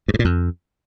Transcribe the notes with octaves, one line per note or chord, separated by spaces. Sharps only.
G2
G#2
A#2
F2